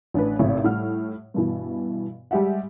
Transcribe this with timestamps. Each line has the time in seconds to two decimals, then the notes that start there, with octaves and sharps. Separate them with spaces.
0.14 A1 D4 B4
0.39 G#1 A2 C3 C#5 E5
0.64 A2 G3 F#5 F6
1.34 G2 B2 E3
2.31 G3 G#3 G4 E5 F#5